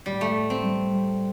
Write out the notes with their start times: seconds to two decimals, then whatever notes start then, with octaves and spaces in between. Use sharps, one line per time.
0.06 A2 G3
0.21 A3
0.35 A2
0.50 C4
0.64 G3
0.94 G3